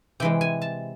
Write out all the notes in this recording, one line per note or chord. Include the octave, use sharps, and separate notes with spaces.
C3 E3 G#3 G5
G#5
A5